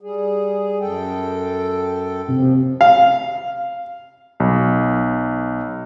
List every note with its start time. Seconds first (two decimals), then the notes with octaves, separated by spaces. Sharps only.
0.01 G3 G#4
0.81 F#2 A4 G5
2.28 D#2 C3 F3
2.81 F5
4.40 B1